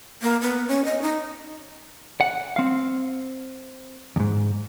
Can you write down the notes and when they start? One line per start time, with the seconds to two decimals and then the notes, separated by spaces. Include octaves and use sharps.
0.22 A#3
0.41 B3
0.68 C#4
0.85 D#5
1.02 D#4
2.21 F#5
2.56 C4 F5
4.16 E2 G#2